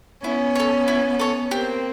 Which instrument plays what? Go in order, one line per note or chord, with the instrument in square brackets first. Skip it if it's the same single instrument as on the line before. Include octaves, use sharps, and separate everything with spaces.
[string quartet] B3 C#4 [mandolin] E4
[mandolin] A4 C#5
E4
A4 C#5
[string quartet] A#3 C4 [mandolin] G4